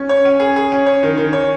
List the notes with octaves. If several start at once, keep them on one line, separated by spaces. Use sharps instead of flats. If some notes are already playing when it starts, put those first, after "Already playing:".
Already playing: C#4
C#5
C#4
G#4
G#4
C#4
C#5
D#3
D#3
C#5